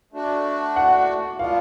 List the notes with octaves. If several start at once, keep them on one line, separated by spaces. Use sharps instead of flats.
A3 D4 F#4
F#5
G#3 B3 D4 F4 F5